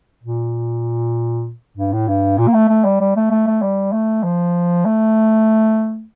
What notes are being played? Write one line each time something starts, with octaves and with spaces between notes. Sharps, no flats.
A#2
G2
A2
G2
A#2
A#3
A3
A3
G3
G3
A3
A3
A3
G3
A3
F3
A3